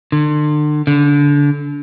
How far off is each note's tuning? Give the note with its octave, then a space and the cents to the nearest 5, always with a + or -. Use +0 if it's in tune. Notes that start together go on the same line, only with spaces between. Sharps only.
D3 +40
D3 -25